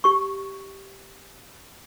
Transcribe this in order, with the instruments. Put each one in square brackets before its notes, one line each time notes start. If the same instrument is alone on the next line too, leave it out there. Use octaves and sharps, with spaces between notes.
[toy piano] G4 C#6